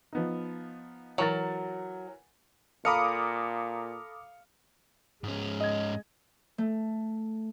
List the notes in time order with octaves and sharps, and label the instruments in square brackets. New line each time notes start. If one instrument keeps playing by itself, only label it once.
[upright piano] F3 B3 D#4
[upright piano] E3 A#4 A6 [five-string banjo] F#3
[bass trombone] A#2 [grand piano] A4 A#5 B5 [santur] F5 [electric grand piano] D6 D#6 C#7
[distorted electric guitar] G#2 C#4 [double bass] G#3
[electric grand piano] D#5 G#6
[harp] A3